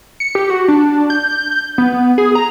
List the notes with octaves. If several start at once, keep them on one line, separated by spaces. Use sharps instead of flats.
C#7
G4
F#4
D4
G6
G6
B3
G#4
A#5